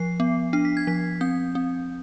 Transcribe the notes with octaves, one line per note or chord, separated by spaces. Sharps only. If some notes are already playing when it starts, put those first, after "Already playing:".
Already playing: F3 C7
B3
D4 C7
B6
G#6
F3 B6
C4 G6
C4